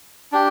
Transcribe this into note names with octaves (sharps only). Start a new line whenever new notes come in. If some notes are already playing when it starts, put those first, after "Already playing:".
D4 G4